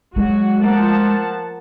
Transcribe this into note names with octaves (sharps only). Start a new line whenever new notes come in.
F#3 G#3 F#4
F3 A#3 F#5 A5